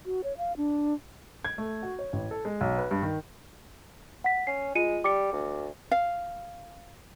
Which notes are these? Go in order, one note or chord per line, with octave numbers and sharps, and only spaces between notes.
F#4
C#5
F5
D4
G#6
A3
F#4
C#5
A1
A4
G#3
B1
B4
G2
D#3
F#5 B6
C#4 C7
G#3 F4 C#7 D#7
G3 D6 C#7
D2
F5